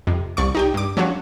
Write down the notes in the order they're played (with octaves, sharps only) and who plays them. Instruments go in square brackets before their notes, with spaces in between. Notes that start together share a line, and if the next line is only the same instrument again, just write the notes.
[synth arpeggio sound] F2 C3
C2 D5 C#6
D#4 G4 G5
G2 D6
F3 F#3 C#4 D4 F#4